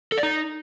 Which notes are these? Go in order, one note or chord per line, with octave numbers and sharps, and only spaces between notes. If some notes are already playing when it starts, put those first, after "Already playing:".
A4
D5
D#4